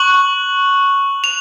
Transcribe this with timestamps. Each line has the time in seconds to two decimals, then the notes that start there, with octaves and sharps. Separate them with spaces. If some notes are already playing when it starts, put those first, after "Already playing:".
Already playing: C#6 F#6 F#7
1.24 F7